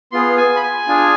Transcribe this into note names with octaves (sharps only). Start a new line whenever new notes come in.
B3 F4 G#4 C6
G#5
B5
G#5
D4 F4 G#4